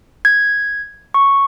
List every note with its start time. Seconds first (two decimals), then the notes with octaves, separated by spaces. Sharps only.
0.25 G#6
1.14 C#6